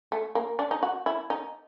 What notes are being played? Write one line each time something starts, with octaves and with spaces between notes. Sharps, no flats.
A3
A#3
D4
D#4
F#4
E4
D#4